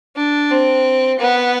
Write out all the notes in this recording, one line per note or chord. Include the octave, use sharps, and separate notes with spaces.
D4
C4
B3